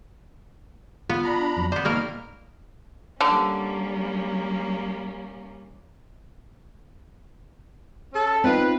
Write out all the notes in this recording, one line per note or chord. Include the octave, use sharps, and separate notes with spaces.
B3 F4
D4 A#5 B5
F2 F#3
B3 C5 D5
D#2 B2 D#3 A#3 A#4 F6
D3 G3 A#3 C#4
C#4 A4
C4 D#4 F4 B4